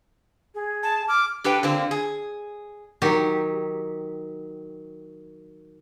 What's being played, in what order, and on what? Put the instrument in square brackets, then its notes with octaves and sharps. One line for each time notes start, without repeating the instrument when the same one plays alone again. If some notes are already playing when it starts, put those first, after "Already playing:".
[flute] G#4
[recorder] A5
[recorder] D6 [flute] F6
[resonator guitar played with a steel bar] D4 G4 A4 B4 G5
D3 A#3 C4 F4
G#4
[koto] D#3 F#3 G4